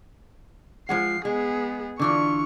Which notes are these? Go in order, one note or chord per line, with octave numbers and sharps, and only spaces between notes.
F3 G#3 F#5 C7
G#3 B3 G#4
D3 E3 F4 C#6